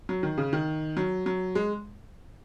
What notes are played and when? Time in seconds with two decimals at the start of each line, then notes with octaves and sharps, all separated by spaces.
0.09 F#3
0.23 D#3
0.38 C#3
0.53 D#3
0.97 F#3
1.26 F#3
1.55 G#3